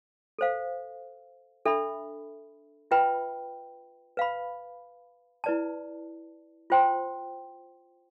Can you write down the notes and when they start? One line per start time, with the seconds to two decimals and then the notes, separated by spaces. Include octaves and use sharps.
0.39 A4 C5 F5
1.66 D4 A4 E5 B5
2.91 F4 B4 E5 G5 B5
4.17 B4 F5 B5
5.44 E4 B4 D5 A5
6.70 F4 C5 G5 C6